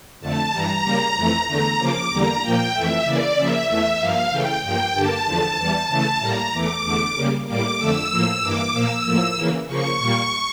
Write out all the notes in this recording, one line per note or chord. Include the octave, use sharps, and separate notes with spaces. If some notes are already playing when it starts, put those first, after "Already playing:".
F2 D3 A3 A5
G2 E3 G3 A#5
C#3 G3 A#3
F2 E3 A3
E2 D3 A3 A#5
C#3 F3 A#3 D6
E2 D3 G3 A#3 A#5
A#2 F3 A#3 G5
F2 E3 A3 E5
C#3 E3 A#3 D5
C#3 F3 A#3 E5
E2 E3 A3 E5
G2 F3 A#3 F5
C#3 E3 A3 G5
G2 F3 A#3 G5
G2 D3 G3 A#3 A5
E2 D3 F3 A3
E2 E3 G3
C#3 E3 A3
A2 G3 A#3 A#5
E2 E3 A3 D6
E2 D3 A3
C#3 G3 A#3
A2 G3 A#3 D6
F2 D3 A3 E6
A2 F3 A#3
G2 E3 A#3 D6
A#2 F3 A#3 E6
A2 F3 A#3
C#3 E3 A#3
C#3 F3 A#3 C#6
A#2 G3 A#3